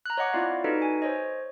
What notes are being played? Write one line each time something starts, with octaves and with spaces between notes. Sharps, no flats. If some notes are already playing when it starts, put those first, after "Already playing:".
A#5 F#6
C#5 D#5 F#5 D6
C4 E4 F4 D5 F5
D#4 F#4 A4 B4 D#5
G#5
C5 C#5 D#5